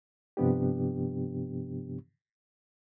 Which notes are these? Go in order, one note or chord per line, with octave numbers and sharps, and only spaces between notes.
G2 C3 F3 B3 D4 G4